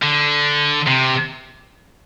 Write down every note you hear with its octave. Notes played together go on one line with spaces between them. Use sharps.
D3
C3